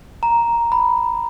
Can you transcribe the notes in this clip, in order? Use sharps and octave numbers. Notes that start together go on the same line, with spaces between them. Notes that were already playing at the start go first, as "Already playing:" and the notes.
A#5
B5